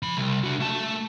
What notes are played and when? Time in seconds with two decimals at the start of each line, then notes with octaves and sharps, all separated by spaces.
0.02 F3 B5
0.17 C2
0.44 D4 F#4
0.60 A3 A5